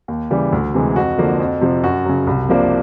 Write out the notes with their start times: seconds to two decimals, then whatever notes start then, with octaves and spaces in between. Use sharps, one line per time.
0.08 D#2
0.31 C#3 E3 G3
0.52 D2
0.74 C3 E3 G#3
0.96 F2 F#4
1.18 D3 F3 A#3
1.40 F2
1.61 C3 F3
1.84 F#2 F#4
2.06 C#3 F#3
2.27 C2
2.49 C3 F3 A#3 D4